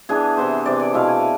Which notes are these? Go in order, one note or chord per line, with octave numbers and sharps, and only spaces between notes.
E3 B3 D4 G#4
C3 E3 B3 C5
C3 E3 B3 D5
D5
B2 A3 E4 F5
G#5